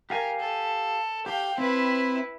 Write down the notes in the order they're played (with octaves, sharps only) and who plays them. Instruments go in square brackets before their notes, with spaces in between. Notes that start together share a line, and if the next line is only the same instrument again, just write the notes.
[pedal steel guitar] G4 F5 G#5 [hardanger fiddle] A#4
[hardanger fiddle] A4
[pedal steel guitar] G4 [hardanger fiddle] F5 G5
[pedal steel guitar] C4 [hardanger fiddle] E4 B4